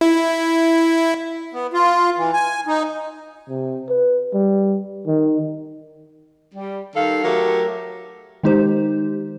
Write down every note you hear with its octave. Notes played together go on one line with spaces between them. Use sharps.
E4
B3
F4
E3
G#5
D#4
C3
B4
G3
D#3
G3
D#3 G3 A4 F5
F#3 A3 G4 A4 A#4
D#3 G#3 D#4 G4 C5